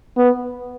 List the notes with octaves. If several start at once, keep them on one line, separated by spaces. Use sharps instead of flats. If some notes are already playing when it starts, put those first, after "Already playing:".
B3